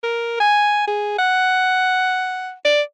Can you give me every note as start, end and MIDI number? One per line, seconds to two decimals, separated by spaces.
0.03 0.36 70
0.40 0.84 80
0.87 1.14 68
1.18 2.52 78
2.65 2.81 74